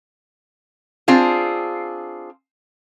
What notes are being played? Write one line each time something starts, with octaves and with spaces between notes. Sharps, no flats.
C4 D4 F4 G#4